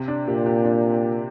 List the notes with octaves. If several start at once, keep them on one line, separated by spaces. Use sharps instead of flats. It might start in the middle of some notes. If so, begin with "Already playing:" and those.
Already playing: C3
D4
A#2 G4
G4
D4